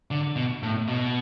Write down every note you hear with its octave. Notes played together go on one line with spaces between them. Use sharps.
D3
B2
A2
B2